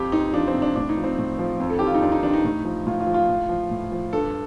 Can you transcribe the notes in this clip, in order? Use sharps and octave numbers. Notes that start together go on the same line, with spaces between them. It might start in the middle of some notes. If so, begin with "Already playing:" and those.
Already playing: F2 F3 G4
F2 D#4
F3 D4
C4
C3
D4
A2 D4
D#4
F3
C4
A2
F3
F2
A4
D#3 G4
F4
D#4
F2 D4
D#4
D#3 D4
D#4
A2
F3
A2 F4
F4
F3
F4
A2
F3
A2
F3
G2 A4